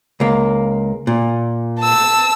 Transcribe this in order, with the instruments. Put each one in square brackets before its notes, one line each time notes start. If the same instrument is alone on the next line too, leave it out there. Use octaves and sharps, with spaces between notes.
[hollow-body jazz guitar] C#2 A#3
A#2
[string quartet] A5 E6